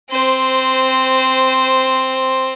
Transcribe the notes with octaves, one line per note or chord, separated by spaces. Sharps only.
C4 C5